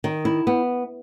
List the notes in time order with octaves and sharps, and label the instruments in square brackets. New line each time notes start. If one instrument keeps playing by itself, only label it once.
[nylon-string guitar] D#3
E4
B3